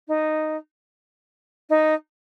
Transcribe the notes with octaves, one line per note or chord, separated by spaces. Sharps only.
D#4
D#4